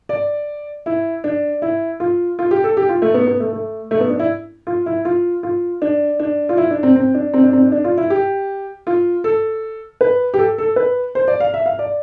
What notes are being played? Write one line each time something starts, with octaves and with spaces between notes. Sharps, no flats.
D5
E4
D4
E4
F4
F4
G4
A4
G4
F4
A3
B3
B3
A3
A3
A3
B3
D4
E4
F4
E4
F4
F4
D4
D4
F4
E4
D4
C4
C4
D4
C4
D4
C4
D4
D4
F4
E4
G4
F4
A4
B4
G4
A4
A4
B4
C5
D5
F5
E5
F5
D5